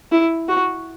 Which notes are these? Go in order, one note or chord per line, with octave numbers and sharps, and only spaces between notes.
E4
F#4